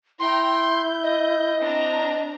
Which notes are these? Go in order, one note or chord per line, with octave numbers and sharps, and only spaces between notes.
E4 G5 A#5 C6
G6
D#5
C4 D4 A#5